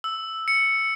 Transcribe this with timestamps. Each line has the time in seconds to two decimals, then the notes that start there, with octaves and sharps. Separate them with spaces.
0.04 E6
0.48 C#7